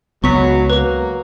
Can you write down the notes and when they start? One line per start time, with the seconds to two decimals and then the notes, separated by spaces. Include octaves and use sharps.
0.24 C#2 F#3 B3 C#6 B6
0.70 F#3 A#3 B4